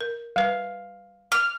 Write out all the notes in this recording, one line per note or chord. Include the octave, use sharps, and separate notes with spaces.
A#4
G3 B4 F5
F6